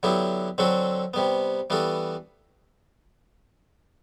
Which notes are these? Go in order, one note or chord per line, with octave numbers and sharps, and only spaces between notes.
D3 F#3 B3 E4 G4
D3 F#3 C4 F#4 A4
C3 G3 B3
E3 G3 B3 F#4 A4